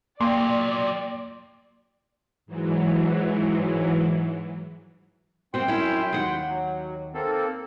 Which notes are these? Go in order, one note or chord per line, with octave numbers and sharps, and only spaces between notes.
A#2 F#3 A#3 D5 G5 C6
G#2 E3 F#3
F#2 C4 F#4 G5 C6
C#4 E4
D#2 F#5
F#3
A#3 C4 A4